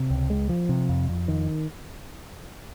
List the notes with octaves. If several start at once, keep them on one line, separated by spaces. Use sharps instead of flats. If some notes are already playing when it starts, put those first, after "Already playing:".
Already playing: C3
C#2
G#3
F3
C3
F2
F2
D#3